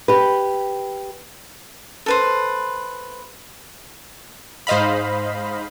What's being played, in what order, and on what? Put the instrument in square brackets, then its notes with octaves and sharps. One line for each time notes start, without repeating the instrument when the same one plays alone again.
[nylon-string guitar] G4 B4
[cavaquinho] A4 B4 C5
[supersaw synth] G#2 C5 D#5 F5 B5